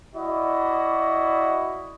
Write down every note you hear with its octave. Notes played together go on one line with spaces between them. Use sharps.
E4 F#4 D5 D#5